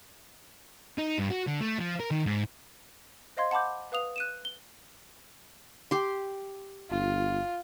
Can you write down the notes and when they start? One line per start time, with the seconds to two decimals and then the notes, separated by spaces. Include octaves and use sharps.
0.98 D#4
1.18 G2
1.30 F#4
1.47 D3
1.61 A3
1.79 F3
2.00 A#4
2.11 D#3
2.26 G#2
3.37 C5 D#5 F5 C6 G#6
3.51 F#5 A5 B5 D6 G6
3.92 B4 F5 D#6 F7
4.16 F#6 D#7 E7
4.45 G7
5.91 G4 C6
6.91 G1 F4